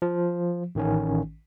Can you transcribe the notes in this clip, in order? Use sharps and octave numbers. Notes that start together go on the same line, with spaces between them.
F3
A1 D#3 C#4